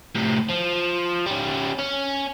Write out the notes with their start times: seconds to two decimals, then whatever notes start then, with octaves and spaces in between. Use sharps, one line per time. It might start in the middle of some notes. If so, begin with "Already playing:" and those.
0.16 A2 C3
0.50 F3
1.26 G3 C#4
1.79 C#4